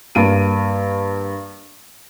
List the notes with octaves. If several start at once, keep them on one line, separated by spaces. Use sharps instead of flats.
G2 A#3 D7 D#7